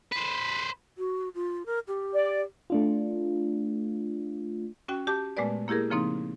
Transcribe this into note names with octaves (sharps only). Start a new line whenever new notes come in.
B4 C5
F#4
F4
A#4
G4
D5
A3 D4 F4
C#4 F#4 G5
G4 A5 D6 G6
A#2 G#3 A3 B3 B4 D5
A#3 E4 G4 G#4 A#4
C#3 F3 A#3 C4 D#4